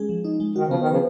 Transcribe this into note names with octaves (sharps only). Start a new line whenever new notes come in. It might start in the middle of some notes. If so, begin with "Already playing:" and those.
Already playing: G#3 C#4 G#4
F3
D#4
G#3
D#3 F#4
C#3 F3
B3
D#3
C#3 F3 B4